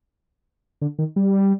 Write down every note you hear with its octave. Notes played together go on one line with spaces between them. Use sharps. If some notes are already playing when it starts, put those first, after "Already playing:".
D3
D#3
G3